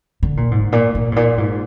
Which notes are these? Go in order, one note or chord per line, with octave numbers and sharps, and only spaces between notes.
D3
A#2
G#2
A#2
A#2
G#2
A#2
G#2